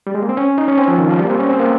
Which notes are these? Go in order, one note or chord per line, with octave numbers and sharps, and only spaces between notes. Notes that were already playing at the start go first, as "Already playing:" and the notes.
G3
G#3
A#3
C4
C#4
D#4
C#4
C4
F3
D#3
F3
G3
A#3
C4
C#4
C4
A#3